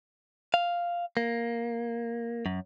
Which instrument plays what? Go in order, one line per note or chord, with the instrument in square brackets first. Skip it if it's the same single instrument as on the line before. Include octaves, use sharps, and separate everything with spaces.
[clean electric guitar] F5
A#3
F#2